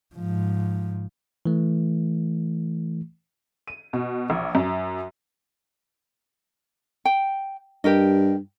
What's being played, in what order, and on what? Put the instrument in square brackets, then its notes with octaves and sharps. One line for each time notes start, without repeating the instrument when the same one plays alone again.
[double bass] G#2 F3
[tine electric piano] E3 A3
[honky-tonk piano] D#7
B2
A#1
F#2
[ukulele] G5
[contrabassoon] G2 [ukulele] G4 A#4 D#5